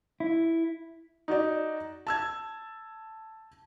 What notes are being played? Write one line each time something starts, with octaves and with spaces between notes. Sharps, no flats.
E4
D#4 F#4 D5
A5 E6 G#6